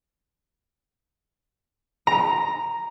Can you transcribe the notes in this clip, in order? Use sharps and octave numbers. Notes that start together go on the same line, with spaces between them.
A#5